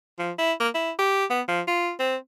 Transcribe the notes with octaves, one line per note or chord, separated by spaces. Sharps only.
F3
E4
A#3
E4
G4
B3
F3
F4
C4